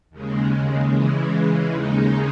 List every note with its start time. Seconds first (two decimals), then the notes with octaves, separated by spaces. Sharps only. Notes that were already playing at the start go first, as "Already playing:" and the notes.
0.10 D#2 C#3 G#3
0.91 C#3 E3 G#3
1.72 D#2 C#3 G#3 D#4